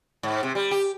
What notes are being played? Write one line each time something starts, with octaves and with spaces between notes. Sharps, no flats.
G#2
C3
G3
G4